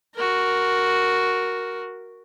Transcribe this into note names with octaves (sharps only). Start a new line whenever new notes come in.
F#4 A#4